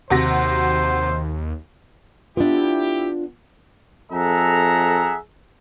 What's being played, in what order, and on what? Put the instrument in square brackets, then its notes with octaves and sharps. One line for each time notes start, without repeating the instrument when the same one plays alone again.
[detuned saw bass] D#2 [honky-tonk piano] C3 F#4 A#6 [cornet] C5
[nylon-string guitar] B3 D4 [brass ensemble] E4 G4 [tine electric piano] F4
[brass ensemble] F2 G#4 A4 E5 F#5 A#5